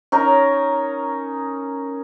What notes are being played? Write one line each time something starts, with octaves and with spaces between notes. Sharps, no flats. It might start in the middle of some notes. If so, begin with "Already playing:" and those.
C#4 D#4 A#4